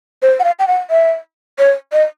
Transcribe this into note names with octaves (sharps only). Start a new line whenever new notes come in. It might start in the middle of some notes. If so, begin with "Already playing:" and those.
C5
F#5
F5
G5
F#5
E5
C#5
D#5